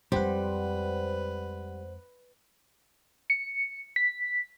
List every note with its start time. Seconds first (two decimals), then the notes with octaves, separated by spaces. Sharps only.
0.12 F2 G3 G#3 B4 C5 F#5
3.30 C#7
3.96 B6